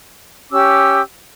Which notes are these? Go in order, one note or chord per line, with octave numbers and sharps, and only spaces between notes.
C#4 G4 D6 E6